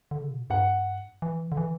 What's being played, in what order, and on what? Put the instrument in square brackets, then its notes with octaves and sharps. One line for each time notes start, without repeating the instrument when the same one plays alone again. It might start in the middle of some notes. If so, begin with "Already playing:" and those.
[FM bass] D3
C#3
B2
A#2
[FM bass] G2 [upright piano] F#5
[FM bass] E3
D3
E3